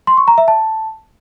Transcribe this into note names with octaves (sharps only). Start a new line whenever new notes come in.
C6
C#6
A#5
E5
A5